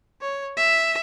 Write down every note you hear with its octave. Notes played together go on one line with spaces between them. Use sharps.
C#5
E5